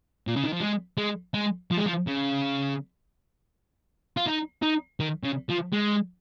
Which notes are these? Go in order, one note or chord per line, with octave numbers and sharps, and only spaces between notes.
A#2
C#3
D#3
F3
G#3
G#3
G#3
F3
G#3
F3
C#3
F4
D#4
D#4
D#3
C#3
F3
G#3